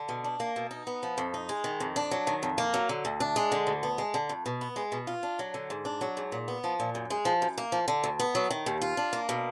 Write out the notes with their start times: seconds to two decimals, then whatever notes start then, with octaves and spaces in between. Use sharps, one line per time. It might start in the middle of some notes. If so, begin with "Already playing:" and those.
Already playing: D3
0.09 B2
0.24 D4
0.40 A#3
0.56 B2
0.71 D#4
0.87 B3
1.03 F3
1.18 F2
1.34 D#4
1.49 G#3
1.64 D#3
1.80 F2
1.96 D4
2.11 F#3
2.27 D#3
2.43 F2
2.58 A#3
2.74 F#3
2.89 D3
3.05 D2
3.20 D4
3.36 G#3
3.52 D3
3.67 D2
3.83 B3
3.98 G#3
4.14 D3
4.29 F2
4.46 B2
4.61 B3
4.76 G#3
4.92 B2
5.07 F4
5.23 D4
5.39 F#3
5.54 D3
5.70 G#2
5.85 D4
6.01 F#3
6.17 G#2
6.32 A#2
6.48 B3
6.64 F3
6.80 A#2
6.95 F#2
7.10 G#3
7.25 F3
7.42 F#2
7.58 A#3
7.72 F3
7.88 D3
8.04 D2
8.19 B3
8.35 F#3
8.50 D#3
8.66 D#2
8.82 F4
8.97 D4
9.13 A#3
9.29 B2